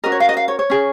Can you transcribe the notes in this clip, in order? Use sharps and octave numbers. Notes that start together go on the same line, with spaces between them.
C#4 F#4 A#4 D#5
C#5
F5
D#5
F5
C#5
C#5
C#4 G#4